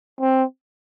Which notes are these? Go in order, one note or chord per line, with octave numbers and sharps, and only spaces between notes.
C4